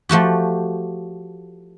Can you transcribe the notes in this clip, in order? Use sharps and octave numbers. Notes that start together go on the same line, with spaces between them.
F3 A3 F#4 G4